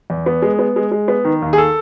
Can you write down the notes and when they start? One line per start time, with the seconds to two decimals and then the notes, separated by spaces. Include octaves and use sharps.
0.10 E2
0.26 B3
0.42 G#3
0.59 B3
0.76 G#3
0.92 G#3
1.08 B3
1.25 D#3
1.42 D#2
1.53 G#4
1.58 A4